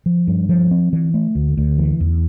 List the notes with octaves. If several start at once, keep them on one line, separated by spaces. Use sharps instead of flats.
F3
G2
F3
C4
E3
A3
D2
D2
E3
E2